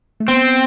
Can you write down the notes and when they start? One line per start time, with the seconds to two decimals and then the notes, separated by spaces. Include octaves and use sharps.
0.20 A3
0.28 B3 C4